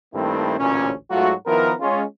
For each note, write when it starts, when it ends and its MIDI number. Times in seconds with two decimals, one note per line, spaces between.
0.14 0.56 43
0.14 0.56 51
0.14 0.56 57
0.14 0.56 58
0.14 0.56 60
0.14 0.56 64
0.59 0.92 33
0.59 0.92 38
0.59 0.92 46
0.59 0.92 61
1.11 1.33 44
1.11 1.33 54
1.11 1.33 57
1.11 1.33 65
1.11 1.33 66
1.47 1.72 51
1.47 1.72 53
1.47 1.72 59
1.47 1.72 64
1.47 1.72 70
1.81 2.03 56
1.81 2.03 61
1.81 2.03 65